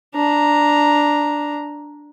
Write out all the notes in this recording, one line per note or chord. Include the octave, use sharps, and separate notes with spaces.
D4 A#5